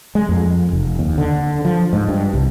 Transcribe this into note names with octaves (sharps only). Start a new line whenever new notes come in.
G#3
F2
F1
D#2
D3
F3
G#2
G2
C2